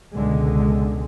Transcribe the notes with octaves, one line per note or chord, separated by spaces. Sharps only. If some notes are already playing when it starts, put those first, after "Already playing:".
C#2 B2 D3 G#3